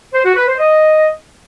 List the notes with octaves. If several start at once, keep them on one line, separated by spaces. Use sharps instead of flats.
C5
F#4
B4
C5
D#5